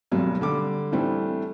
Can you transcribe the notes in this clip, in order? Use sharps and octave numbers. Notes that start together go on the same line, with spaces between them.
G#1 D2 B2 F#3 G3
D3 G3 D6
A2 E3 G3 A3 C4 D4